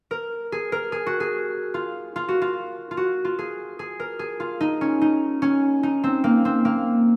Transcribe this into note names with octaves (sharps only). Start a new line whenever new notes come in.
A#4
G#4
A#4
G#4
F#4
G#4
F4
F4
F#4
F4
F4
F#4
F4
G#4
G#4
A#4
G#4
F4
D#4
C#4
D#4
C#4
D#4
C4
A#3
C4
A#3